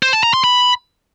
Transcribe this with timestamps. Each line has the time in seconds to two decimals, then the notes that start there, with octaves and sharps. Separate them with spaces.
0.03 C5
0.13 A5
0.23 A#5
0.34 C6
0.44 B5